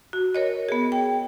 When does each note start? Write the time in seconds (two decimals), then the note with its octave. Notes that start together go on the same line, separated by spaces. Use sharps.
0.13 F#4
0.35 A#4 C#5 D#5
0.69 B3 G#4
0.92 G5